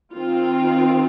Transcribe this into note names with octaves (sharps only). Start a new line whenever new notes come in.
D#3 C4 F4